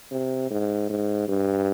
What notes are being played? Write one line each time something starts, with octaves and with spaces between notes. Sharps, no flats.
C3
G#2
G#2
G2